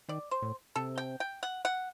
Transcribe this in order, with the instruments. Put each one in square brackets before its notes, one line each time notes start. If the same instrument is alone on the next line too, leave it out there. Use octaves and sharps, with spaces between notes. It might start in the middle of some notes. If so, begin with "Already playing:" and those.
[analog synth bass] D#3 [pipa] D5
[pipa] C5
[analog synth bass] A2
[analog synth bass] C3 [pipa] A4
[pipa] G5
G5
F#5
F#5